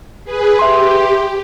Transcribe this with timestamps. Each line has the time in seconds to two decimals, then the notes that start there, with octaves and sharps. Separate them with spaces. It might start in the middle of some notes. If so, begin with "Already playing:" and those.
0.24 G#4 B4
0.59 G4 E5 C6